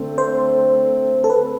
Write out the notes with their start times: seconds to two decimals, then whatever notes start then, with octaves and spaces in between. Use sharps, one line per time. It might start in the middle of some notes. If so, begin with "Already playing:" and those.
Already playing: D3 A3 C4
0.18 C5
1.24 A4
1.30 B4